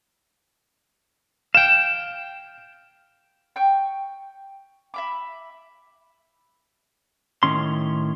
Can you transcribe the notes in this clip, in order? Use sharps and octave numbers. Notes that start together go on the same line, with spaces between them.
F5 G5 E7
G5 C#6 G6
E5 B5 D6
A2 D#3 C#4 C6